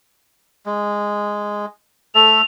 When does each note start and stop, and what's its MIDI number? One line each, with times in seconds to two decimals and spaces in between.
0.66 1.66 56
2.15 2.42 57
2.15 2.42 69
2.15 2.42 76
2.15 2.45 101